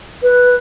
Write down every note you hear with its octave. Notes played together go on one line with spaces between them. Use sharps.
B4